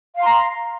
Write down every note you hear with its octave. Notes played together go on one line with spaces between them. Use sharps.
F5 A#5 C6